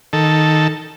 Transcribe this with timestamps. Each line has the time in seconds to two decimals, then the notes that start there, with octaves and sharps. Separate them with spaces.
0.13 D#3 A4